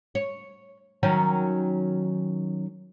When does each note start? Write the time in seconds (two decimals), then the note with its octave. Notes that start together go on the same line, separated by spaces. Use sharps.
0.15 C#5
1.03 D#3 F#3 C#4